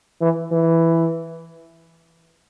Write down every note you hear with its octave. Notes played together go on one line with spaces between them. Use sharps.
E3
E3